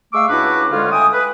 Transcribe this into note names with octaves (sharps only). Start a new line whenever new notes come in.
G#3 A3 F5 C#6 D6 E6
C#2 D4 E4 F#4 B4 D6
D2 D3 G#3 C#4 F4
A3 G5 G#5 D#6
B4